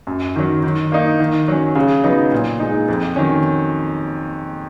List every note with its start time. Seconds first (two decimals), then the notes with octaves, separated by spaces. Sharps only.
0.07 F#2
0.36 D#3 F#3
0.63 D#3
0.92 A#3 D#4
1.20 D#3
1.48 F#3 C#4
1.75 C#3
2.04 F#3 B3 D#4
2.32 A#2
2.60 G#3 D#4
2.88 F2
3.16 D#3 F#3 C#4